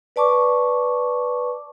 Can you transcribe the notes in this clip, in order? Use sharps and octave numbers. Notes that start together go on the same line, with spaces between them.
B4 D5 A5 C#6 D6